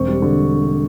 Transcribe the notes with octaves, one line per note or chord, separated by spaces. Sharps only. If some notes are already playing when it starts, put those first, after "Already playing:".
Already playing: E1 C4 C#6
G3
D3